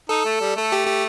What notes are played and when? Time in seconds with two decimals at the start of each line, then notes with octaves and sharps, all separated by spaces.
0.09 D#4 A4
0.26 A3
0.41 G3
0.56 A3 A4
0.72 G4
0.87 G4